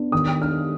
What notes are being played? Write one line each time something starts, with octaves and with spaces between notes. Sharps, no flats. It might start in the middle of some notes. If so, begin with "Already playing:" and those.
Already playing: B3 D4
D#3 D#6
D4 F6